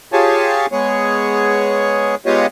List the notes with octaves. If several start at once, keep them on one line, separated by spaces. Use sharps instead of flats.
F4 G4 G#4 C#5 G#5 A5
G#3 B3 G#4 C#5
G#3 B3 F4 G4 C#5 D#5